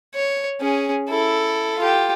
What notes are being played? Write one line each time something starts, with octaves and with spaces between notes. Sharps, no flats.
C#5
C#4 G#4
E4 A4
F4 G4